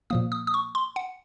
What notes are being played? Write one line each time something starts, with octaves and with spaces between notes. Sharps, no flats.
A#2 F3 A#3 D#6
D#6
D#6
C#6
C6
F#5